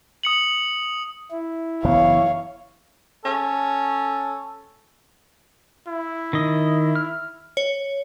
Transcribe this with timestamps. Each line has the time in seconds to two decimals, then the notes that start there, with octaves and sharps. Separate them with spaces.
0.23 D#6 C#7 F#7
1.31 E4
1.84 F#1 E3 B3 C#5 F5
3.25 C#4 A4
5.88 E4
6.33 D#3 D#5
6.96 F6
7.57 C#5